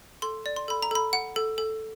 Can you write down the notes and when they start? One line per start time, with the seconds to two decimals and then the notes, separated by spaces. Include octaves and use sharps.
0.22 A4 C6
0.46 D5
0.56 C6
0.68 A4 B5
0.82 A#5
0.91 A4 B5
1.13 F#5
1.36 A4
1.58 A4